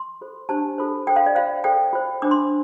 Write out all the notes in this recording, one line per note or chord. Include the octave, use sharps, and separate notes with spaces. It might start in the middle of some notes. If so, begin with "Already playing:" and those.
Already playing: C6
F4 A4 C5
D4 G4 C5 A5
F4 A4 C5
F4 A4 C5 G5
F5
D5
F4 C5 F5
F4 A4 C5 G5
F4 C5
D4 F4 C5 D6
C6